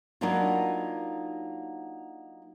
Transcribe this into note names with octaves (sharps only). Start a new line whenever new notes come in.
F#3 A#3 B3 D4 D#4 F4